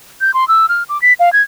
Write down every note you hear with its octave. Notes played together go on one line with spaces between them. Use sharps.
G6
C6
E6
F6
D6
B6
F5
G#6